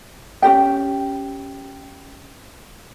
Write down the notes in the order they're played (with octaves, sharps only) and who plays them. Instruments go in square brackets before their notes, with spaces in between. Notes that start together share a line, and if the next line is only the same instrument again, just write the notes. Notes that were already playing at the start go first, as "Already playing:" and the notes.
[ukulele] C#4 F#4 G4 G5